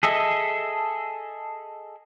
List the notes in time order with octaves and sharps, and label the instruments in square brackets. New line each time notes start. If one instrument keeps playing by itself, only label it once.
[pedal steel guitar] G#4 A4 D#5 E5